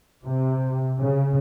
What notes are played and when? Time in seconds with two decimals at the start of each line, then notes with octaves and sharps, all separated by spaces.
0.24 C3
0.99 C#3